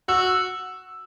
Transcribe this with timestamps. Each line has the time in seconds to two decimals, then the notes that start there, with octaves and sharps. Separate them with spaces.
0.08 F#4 E6